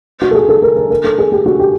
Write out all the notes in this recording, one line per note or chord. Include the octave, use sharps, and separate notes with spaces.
F#4
A4
G#4
A4
A#4
A#4
A#4
A4
G#4
G4
F#4
G4